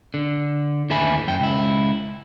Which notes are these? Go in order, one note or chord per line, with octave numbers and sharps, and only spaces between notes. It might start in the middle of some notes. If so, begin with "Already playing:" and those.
D3
D#2 A2 A4 E5 G#5 B5
F#2 G5
C#2 E4